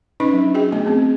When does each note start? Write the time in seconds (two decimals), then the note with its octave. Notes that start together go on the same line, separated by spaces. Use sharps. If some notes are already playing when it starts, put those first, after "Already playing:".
0.20 C#4 D#4 B4 D#5 B5
0.33 F#3 D4
0.54 F#4 G#4 D#5 G5
0.72 A3 B3 D#5
0.85 B3 C4 G#4
0.99 B3